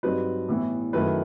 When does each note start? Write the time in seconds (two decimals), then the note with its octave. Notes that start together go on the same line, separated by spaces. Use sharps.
0.03 G2 F#3 C4 D#4 B4
0.48 A2 E3 B3
0.93 F#2 D#3 A3 E4 B4